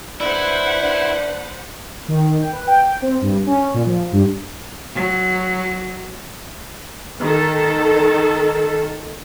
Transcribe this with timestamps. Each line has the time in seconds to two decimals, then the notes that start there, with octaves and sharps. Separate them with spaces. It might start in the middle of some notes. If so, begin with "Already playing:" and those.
0.20 D4 E4 B4 C5 F#5
0.81 D4
2.08 D#3
2.40 G5
2.52 B4
2.67 G5
3.02 C4
3.21 G2
3.46 C#4
3.74 A#2
3.86 F3
4.12 G2
4.95 F#3
7.21 D#3 A4